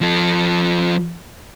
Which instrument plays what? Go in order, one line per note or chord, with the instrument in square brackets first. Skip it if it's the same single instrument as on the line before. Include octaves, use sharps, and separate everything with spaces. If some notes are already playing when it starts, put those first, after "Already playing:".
[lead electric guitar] F3 A4